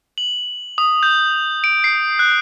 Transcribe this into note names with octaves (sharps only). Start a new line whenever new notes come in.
F#7
D#6
G6
D7
C7
F#6